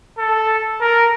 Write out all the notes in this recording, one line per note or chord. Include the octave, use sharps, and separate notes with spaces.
A4
A#4